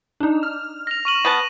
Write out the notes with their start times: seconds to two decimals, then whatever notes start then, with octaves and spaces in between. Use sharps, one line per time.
0.20 D4 D#4
0.43 F6
0.87 F6 A#6 F7
1.05 C#6 D#7 F#7
1.25 B3 B4 A5